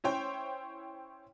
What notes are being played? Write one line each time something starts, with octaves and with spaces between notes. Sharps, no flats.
C#4 E4 C5 C#5 G5